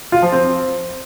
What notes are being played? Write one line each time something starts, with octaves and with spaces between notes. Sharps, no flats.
F4
F3
C4